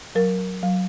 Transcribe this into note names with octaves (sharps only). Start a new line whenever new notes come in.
F#3 A#4
F#3